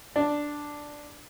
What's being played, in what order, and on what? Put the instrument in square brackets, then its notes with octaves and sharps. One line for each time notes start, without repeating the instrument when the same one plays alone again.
[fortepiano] D4